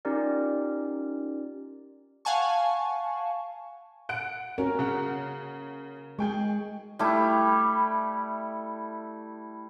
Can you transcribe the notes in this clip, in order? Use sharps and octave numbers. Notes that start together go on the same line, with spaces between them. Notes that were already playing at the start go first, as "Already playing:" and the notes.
C#4 D#4 F4 G4 A#4 D5
F5 F#5 G#5 A5 C#6
F#5 F#6 D7
C#4 F#4 A#4
C#3 F#5
G#3 G#4 G5 C#6
G3 A3 E4